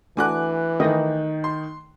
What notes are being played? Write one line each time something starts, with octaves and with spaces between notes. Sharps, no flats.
E3 A3 D4 F#4 G#5 D6 F#6
D#3 A3 D#4 D#5
C6